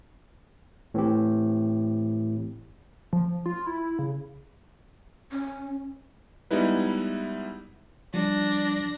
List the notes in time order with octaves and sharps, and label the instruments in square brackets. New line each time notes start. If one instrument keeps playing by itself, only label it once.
[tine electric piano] A2 E3 C4 G4
[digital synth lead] F3
F4
E4
C#3
[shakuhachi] C#4
[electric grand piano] G3 G#3 B3 D#4 E4 B4
[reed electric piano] F3 G3 [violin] D4 A#6